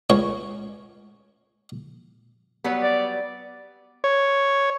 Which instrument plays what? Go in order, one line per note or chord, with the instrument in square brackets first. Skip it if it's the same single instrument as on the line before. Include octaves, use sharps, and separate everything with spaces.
[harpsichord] C#2 C#5
[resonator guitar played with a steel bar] F#3 G3 B3
[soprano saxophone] D5
[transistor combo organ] C#5